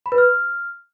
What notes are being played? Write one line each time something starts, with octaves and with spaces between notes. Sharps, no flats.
B5
B4
F6